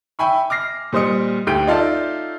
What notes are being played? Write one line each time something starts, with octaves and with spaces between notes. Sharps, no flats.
E5 G5 G#5 B5 C#6
D6 F6 A#6 C7
A#2 G3 C5 D#5 D#6 C#7
D2 G4 G6 D7
D#4 F4 A4 D5 E5